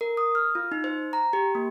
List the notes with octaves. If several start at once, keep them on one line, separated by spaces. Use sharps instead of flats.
A#4
D#6
F6
F4
D#4
C5
A#5
G4
A#3